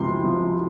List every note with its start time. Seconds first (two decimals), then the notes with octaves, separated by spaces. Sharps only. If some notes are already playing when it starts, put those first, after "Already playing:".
Already playing: C#2 C3 F3 C6
0.23 C3 F3